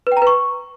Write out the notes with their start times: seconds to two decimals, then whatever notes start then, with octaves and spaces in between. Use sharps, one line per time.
0.07 B4
0.12 G5
0.17 A#5
0.22 B4
0.27 C#6